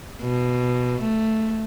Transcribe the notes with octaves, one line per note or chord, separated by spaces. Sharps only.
B2
A3